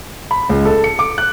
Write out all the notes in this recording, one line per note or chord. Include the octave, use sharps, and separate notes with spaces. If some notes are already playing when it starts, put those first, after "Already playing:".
B5
C#2
A4
C#7
D6
F#6